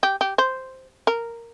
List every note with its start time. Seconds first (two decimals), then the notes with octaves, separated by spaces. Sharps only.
0.03 G4
0.21 G4
0.38 C5
1.07 A#4